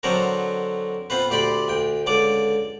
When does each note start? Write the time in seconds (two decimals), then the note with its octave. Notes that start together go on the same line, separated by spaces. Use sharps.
0.03 D3 F#3 C4 A4 A#4
1.10 B3 C4 F4 B4
1.30 D2 G4 D5 B5 C6
1.68 D2 G5
2.06 C#2 D3 D5 D6